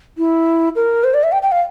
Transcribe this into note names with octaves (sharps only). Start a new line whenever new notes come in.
E4
A#4
C5
D5
E5
G5
G5
F5